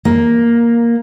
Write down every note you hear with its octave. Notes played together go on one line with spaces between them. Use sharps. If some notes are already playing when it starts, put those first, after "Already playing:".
A#3